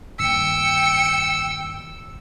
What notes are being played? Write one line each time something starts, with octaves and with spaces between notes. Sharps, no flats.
G2 D#3 A#3 G5 E6 C#7